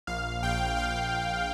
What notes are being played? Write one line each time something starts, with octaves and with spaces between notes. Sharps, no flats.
A#1 F5
A#1 G5
A#1 F5